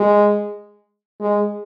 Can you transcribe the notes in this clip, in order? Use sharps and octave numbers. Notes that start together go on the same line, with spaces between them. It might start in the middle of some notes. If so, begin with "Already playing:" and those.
Already playing: G#3
G#3